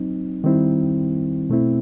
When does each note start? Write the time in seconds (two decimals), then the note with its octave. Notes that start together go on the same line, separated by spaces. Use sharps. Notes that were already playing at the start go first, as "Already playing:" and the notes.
Already playing: F#3 C4 D#4
0.44 D#3 G3 C4 E4
1.50 B2 A3 C4 E4